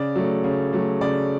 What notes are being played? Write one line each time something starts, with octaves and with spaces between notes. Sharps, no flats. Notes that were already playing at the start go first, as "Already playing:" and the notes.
Already playing: C#3 D5
F#3 A3
C#3
F#3 A3
C#3 D5